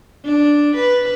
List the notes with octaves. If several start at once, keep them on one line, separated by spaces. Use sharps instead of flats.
D4
B4